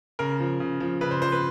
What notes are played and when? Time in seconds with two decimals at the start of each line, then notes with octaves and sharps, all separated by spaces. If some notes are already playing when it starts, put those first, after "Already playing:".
0.19 C#3 A#4
0.40 F3
0.60 C#3
0.80 F3
1.01 C#3 B4
1.11 C5
1.21 F3 C5
1.32 B4